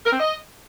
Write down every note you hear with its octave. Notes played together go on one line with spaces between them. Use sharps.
A#4
C4
D#5